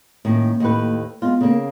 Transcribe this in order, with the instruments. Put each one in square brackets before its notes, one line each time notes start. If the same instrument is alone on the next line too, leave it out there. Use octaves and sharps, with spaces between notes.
[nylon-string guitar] A2 D#3 C#4 [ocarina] A#3
[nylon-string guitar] D#2 A2 B4
[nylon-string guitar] G#3 F4 [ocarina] B3
[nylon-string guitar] C#3 A#3